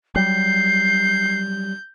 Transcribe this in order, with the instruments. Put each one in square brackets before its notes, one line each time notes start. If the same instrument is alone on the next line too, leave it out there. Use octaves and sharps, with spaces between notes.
[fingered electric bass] F#3 G3 [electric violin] G6 [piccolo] C7